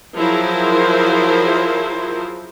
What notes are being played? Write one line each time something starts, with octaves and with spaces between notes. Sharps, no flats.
F3 F#3 E4 G#4 A#4 C5